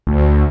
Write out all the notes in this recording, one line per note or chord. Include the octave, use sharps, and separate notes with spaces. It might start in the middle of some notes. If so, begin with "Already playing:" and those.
D2